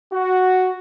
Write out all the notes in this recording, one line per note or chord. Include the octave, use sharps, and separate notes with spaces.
F#4